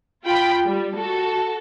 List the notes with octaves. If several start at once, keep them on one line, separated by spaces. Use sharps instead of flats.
F4 G5 B5
G3
F#4 A4